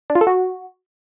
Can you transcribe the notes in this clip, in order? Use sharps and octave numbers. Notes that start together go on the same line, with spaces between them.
D4
F4
A4
F#4